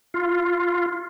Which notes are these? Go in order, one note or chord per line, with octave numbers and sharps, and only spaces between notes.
F4